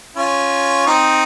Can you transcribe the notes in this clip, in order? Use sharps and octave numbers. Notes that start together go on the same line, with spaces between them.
C#4 F4
C4 D#4